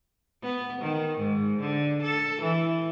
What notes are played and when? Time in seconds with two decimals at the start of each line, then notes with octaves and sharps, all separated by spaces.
0.43 B3
0.82 D#3
1.18 G#2
1.60 D3
2.03 A4
2.42 E3